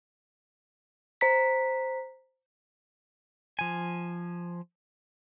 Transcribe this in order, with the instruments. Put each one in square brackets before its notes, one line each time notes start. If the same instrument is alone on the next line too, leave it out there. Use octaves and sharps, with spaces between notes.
[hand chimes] C5 A#5 B6
[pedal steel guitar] F3 G#5